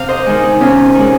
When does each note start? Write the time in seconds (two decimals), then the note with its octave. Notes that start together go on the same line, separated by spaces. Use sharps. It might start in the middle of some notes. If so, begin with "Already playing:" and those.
Already playing: C3 F5
0.08 C5 D#5
0.26 D#3 G#3
0.43 D#4
0.61 C3 C#4 F4
0.95 D#3 G#3